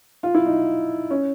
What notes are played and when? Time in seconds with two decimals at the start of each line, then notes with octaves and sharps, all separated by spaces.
0.23 F4
0.34 E4
0.46 D#4
1.10 C#4